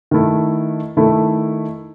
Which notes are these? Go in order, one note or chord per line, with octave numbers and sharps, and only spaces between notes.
D#3 A3 E4 A4
D#3 A3 E4 A4